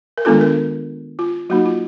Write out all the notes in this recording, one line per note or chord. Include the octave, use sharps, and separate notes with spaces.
A#4
D#3 G#3 B3 D4 F4 A4
A#4
F4
F#3 A#3 D#4 F#4
F4